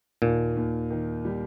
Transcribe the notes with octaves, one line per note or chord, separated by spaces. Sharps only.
D#2 A#2
D#2
D#3
G3